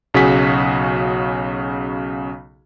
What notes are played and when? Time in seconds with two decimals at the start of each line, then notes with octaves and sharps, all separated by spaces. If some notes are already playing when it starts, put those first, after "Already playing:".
0.14 B1 C#3 F#4 G#4 B6